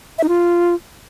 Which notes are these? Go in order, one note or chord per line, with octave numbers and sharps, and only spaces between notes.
E5
D#4
F4